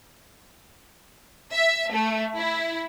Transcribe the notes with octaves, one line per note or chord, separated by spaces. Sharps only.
E5
A3
E4